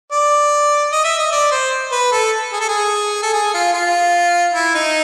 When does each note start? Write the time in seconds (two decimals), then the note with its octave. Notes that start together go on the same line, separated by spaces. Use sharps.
0.11 D5
0.92 D#5
1.05 E5
1.19 D#5
1.32 D5
1.52 C5
1.92 B4
2.12 A4
2.53 G#4
2.61 A4
2.69 G#4
3.23 A4
3.33 G#4
3.54 F4
3.74 F4
4.54 E4
4.74 D#4